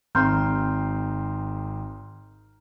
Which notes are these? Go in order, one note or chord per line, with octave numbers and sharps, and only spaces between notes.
G#1 C4 A#5 C6 F6 G6